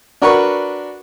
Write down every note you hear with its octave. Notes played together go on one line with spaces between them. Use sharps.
D4 F#4 A#4 B4 B5 C#6